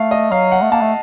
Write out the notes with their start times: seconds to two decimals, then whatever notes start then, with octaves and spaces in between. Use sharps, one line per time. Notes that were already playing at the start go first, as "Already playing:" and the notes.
Already playing: A3 F5
0.11 D#5
0.31 F#3 F5
0.52 F#5
0.62 A3
0.72 A#3 A5
0.82 A3